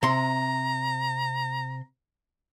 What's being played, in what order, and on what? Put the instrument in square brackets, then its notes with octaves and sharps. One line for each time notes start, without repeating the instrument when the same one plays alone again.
[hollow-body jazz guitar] C3 C6 [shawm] A#5